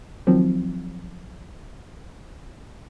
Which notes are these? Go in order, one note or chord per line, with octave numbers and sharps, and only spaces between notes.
D#3 F3 F#3 C4